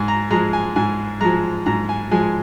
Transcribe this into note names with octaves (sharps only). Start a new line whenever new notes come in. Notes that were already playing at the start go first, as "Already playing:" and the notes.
Already playing: G#2 G#5
A#5
F3 G#3 A#5
G#5
G#2 G#5
F3 G#3 A#5
G#2 A#5
G#5
F3 G#3 G#5